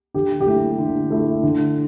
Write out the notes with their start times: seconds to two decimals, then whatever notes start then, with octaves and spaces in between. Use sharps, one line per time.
0.14 D3 G4
0.41 G4
0.46 A3 E4
0.79 D3
1.11 A3 E4
1.43 D3